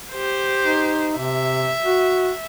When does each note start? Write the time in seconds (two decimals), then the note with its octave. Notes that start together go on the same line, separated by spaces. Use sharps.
0.12 G4 C5
0.62 D#4
1.18 C3 E5
1.83 F#4